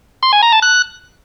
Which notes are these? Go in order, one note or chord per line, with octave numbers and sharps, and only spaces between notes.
C6
G#5
A#5
A5
F#6